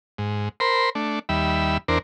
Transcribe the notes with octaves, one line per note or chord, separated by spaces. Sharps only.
G#2
A#4 C5 B5 C6
A3 D4
D#2 G3 E5 B5
E2 D4 A#4 C5